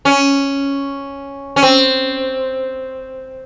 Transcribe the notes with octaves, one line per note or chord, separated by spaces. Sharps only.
C#4
C#4
C4